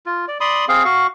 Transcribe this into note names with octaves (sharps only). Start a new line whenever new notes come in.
F4
D5
D5 B5 C6 D#6
C4 G#4 F5
F#4 F5 C#6